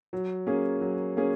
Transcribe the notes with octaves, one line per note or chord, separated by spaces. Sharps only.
F#3
A#3 C#4 G#4
F#3
A#3 C#4 G#4